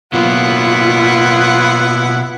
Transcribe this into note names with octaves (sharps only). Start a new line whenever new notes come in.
B2 F#3 A#3 B3 E4 F4 F#5